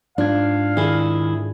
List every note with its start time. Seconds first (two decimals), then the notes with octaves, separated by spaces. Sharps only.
0.18 G#2 D4 F4 F5 G#6
0.77 D#3 E4 G#4